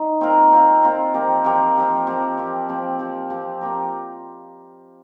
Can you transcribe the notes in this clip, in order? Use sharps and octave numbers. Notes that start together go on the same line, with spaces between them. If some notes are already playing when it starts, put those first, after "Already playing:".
Already playing: D#4
C4 F4 A#4
C4 F4 A#4
C4 F4 A#4
F3 C4 G4 A#4
F3 C4 G4 A#4
F3 C4 G4 A#4
F3 C4 G4 A#4
F3 C4 G4
F3 C4 G4
F3 C4 G4
F3 C4 G4
C4 G4 A#4